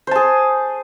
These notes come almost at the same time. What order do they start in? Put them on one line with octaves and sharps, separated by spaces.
C5 A5 G#4